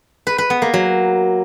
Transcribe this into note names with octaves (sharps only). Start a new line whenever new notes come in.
B4
B4
B3
A#3
F#3